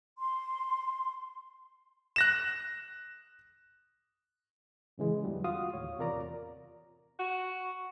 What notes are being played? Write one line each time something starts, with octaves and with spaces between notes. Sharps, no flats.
C6
F#6 A#6 E7
A2 C#3 E3 G#3
E2 D3 F#3 G3
F4 F#4 F5 D#6
D#2 A2 C#5
E2 C3 F4 A#4 D5 A#5
F#4